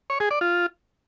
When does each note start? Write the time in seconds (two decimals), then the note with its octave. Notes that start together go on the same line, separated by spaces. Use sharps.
0.10 C#5
0.20 G#4
0.31 D5
0.41 F4